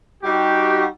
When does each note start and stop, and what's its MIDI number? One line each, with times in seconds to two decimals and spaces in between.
0.23 0.85 55
0.23 0.85 63
0.23 0.85 66
0.23 0.85 67